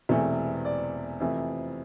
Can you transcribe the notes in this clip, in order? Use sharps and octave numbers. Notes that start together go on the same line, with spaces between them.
E1 E2 C3 E3 A3
D5
F2 C3 E3 A3